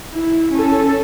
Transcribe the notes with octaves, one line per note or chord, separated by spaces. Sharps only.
E4
C#4 A4